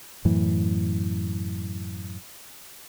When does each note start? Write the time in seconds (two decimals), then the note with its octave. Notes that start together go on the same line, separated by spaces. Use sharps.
0.25 F#2 A2 E3